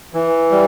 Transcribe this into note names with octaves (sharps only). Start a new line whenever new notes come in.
E3
G3